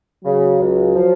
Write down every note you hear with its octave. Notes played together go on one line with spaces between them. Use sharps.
C#3 F#3
C#2
F3